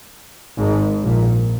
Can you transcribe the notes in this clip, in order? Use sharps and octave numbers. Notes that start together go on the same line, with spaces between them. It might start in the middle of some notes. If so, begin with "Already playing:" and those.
G#1 G#2
A#1 A#2